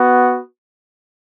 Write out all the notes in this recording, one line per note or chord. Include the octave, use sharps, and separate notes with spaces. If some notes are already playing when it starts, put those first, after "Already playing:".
Already playing: B3 F#4